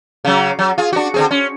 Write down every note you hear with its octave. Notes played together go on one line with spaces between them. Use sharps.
C#3 F#3
F#3
F4 G#4
D4 F#4
D3 C4 G#4
C#4